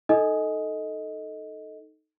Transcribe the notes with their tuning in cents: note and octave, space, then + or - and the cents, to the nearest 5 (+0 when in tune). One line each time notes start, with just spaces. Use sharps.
D#4 +0 A4 +0 D#5 +10